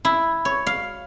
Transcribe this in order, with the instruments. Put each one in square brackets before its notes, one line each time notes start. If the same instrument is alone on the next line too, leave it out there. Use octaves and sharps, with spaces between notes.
[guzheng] E4
C#5
F5